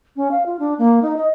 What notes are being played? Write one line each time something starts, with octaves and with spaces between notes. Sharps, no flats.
C#4
F5
F4
D4
A#3
D#4
D#5